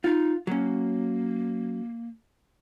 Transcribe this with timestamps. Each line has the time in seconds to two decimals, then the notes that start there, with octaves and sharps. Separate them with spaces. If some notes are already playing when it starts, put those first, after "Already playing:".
0.04 D#4 F4
0.47 F#3 A#3 C#4